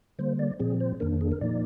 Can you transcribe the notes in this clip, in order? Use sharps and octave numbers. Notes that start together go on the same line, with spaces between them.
D3 G3 A#3 C5
D5
A#2 F3 C4 G#4
C5
F2 D#3 A#3 D4 A#4
G#4
A#4
A#2 F3 A#3 D#4 D5